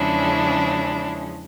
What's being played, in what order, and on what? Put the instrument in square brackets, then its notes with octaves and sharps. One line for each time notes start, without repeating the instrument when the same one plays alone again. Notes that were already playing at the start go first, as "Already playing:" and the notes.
Already playing: [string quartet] E2 C#3 F3 G#3 C#4 D4 E4